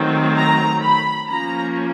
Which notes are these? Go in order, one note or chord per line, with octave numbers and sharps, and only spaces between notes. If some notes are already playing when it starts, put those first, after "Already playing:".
Already playing: D#3 F#3 A3 C4
A#5
B5
F3 A#3 C#4 A#5